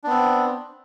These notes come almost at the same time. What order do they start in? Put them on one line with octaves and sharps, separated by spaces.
D4 B3 C4